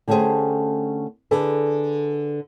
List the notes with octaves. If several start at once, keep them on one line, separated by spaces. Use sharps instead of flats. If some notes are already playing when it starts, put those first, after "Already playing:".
D3 A3 C#4 G4 G#4 C5
D3 G#4 A4 B4